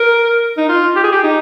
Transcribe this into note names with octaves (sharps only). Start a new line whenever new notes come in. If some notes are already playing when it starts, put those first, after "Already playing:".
Already playing: A#4
D#4
F4
G4
G#4
G4
D#4